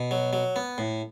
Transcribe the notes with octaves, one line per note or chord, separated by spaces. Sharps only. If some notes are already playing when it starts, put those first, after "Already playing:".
Already playing: B2
F#3
F#3
B3
A2